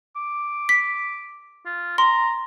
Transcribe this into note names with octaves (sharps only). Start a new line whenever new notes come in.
D6
B6
F4
A#5 C6